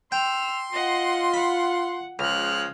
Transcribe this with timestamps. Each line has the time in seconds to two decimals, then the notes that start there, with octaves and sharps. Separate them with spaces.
0.12 G5 C6 E6 F7
0.72 F4 D#5 F#5
1.34 F#5 B5
2.19 C#2 F3 G#3 F6 F#6